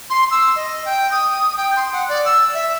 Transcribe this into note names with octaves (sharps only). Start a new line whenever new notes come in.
C6
E6
D#5
G5
D#6
G5
C6
F#5
D5
E6
E5